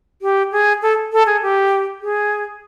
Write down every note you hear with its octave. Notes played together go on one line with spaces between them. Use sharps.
G4
G#4
A4
A4
G#4
G4
G#4